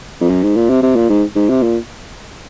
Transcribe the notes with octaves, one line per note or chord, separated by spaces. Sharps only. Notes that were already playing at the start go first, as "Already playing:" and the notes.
F2
F#2
G#2
A#2
C3
C3
A#2
G#2
G#2
C3
A#2